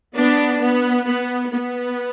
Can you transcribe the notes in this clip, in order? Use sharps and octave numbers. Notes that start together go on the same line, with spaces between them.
B3 D4
B3
B3
B3